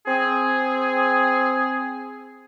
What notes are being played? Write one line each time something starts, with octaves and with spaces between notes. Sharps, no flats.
C4 G#4